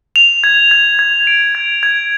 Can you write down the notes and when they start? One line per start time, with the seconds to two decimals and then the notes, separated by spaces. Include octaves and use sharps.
0.16 F7
0.44 G#6
0.71 G#6
0.99 G#6
1.27 D7
1.55 G#6
1.83 G#6